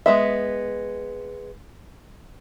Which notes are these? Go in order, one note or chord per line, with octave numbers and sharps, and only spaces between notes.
G#3 B3 E5